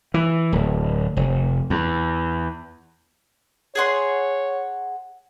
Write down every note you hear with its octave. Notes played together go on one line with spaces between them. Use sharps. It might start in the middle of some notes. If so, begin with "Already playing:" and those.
E3
D1
F1
E2
G#4 C#5 F#5 C6